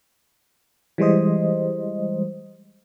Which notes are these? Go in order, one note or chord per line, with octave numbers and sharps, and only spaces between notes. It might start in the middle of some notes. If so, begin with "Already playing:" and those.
E3 G3 G#3 C5 D#5